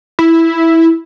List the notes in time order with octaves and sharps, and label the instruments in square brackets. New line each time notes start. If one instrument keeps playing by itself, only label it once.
[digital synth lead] E4